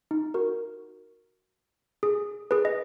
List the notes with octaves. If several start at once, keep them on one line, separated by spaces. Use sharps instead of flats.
D#4
F#4 A#4
G#4
G#4 B4
D#5